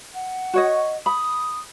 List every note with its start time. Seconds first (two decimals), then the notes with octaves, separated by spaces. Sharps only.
0.14 F#5
0.54 F#4 C#5 D#5
1.06 B5 D#6